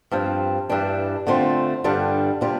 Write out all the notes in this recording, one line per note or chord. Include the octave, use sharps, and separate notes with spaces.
G2 F3 C4
G2 E3 G3 D4
D3 A3 C4 F4
G2 D3 G3 D4 F4
C3 G3 D4 F4